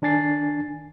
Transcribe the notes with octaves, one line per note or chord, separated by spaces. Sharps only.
D#3 D4 G#5 A6 C7